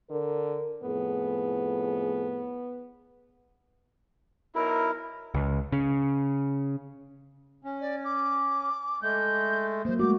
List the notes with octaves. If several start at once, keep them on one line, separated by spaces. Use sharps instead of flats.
D3 A#4
F2 A2 B3 G#4
B1 E4 A#4
C#2
C#3
C#4
D5
D6
G#3 A3 G6
F#3 A#3 C5
G#3 A3 F#4 D6